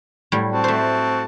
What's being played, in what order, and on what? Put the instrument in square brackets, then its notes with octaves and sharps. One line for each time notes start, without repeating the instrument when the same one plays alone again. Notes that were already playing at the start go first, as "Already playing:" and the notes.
[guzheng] A2 F#3 G3
[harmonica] C4 F#4 A5
[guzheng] A3 C5